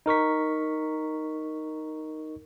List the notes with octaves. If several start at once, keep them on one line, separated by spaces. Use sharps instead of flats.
D#4 A#4 C#6 B6